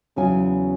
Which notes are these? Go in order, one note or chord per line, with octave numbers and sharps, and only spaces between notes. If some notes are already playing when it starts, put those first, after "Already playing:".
E2 C#3 F#3 C#4 E4 G#5